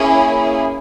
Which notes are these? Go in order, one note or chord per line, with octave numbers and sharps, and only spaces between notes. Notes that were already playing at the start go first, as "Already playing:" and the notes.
Already playing: A#3 C#4 E4 G#4